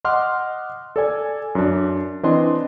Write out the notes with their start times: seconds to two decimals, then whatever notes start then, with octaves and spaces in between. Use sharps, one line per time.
0.05 D#5 F#5 C6 D6 F6
0.96 A4 D5 G#5
1.55 F#2 D4
2.23 E3 C4 D4 D#5 C6